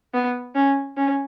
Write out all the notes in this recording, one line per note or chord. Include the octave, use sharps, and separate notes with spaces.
B3
C#4
C#4